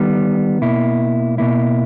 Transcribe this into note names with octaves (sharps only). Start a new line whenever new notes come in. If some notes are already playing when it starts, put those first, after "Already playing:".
Already playing: D#3 G3 B3
B2 A#3 E4
B2 A#3 E4